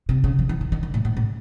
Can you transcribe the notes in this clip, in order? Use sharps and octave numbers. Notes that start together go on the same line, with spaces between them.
C3
C#3
F3
E3
D#3
D#3
D3
A2
A2
A2